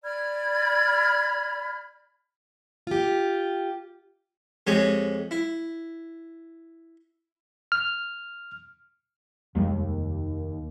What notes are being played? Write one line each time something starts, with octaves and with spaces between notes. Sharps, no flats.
D5 B5 F6 G#6
F4 G4
F2 G#3 G4 C#5 G#5
E4
F6
F1 D#2 G3 G#3